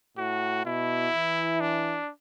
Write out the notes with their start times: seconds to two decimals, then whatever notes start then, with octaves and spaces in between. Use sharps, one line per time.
0.17 A2 F#4
0.65 B2 E4
1.13 E3
1.61 D4